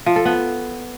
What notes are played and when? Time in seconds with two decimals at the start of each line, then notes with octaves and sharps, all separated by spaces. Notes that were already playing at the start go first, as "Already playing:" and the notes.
0.06 F3
0.16 A4
0.25 B3